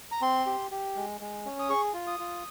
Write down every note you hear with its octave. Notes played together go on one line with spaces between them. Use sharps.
A#5
C4 C6
G4
G4
G#3
G#3
C#4
D#6
G#4 C#6
F4
D#6
F4